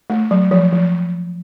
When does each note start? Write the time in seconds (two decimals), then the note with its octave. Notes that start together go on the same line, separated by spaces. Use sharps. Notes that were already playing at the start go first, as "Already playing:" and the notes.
0.10 A3
0.31 F#3
0.51 F3
0.72 F3